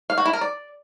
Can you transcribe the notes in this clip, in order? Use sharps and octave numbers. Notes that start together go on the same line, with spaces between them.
F5
F#4
E4
A#4
D5